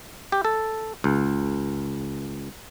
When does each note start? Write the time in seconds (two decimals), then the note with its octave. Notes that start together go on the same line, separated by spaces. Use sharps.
0.32 G4
0.45 A4
1.04 C#2